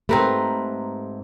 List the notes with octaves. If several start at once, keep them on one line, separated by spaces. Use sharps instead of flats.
G#2 A3 C4 G4 A#4 B4 A#5